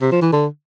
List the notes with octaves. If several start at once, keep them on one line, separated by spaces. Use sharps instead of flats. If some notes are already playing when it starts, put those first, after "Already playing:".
C3
F3
E3
D3